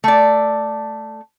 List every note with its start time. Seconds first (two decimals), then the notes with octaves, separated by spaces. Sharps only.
0.04 A3 D5